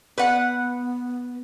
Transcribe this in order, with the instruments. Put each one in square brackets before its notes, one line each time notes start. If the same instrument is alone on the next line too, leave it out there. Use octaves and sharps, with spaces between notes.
[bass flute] B3 [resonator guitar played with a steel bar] B4 F#5